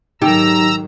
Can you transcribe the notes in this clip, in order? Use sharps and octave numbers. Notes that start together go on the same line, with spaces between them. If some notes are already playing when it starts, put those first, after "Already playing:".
G#2 D#3 F#3 D#4 G4 A#5 E6